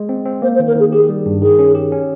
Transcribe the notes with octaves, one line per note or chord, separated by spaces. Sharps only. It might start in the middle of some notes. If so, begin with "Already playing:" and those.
Already playing: G#3
C4
C4
A#3 C5
C5
D#3
A#4
D#3 G#4
G4 G#4
G3
G2
D#3 G#4
C#4
G4
C#4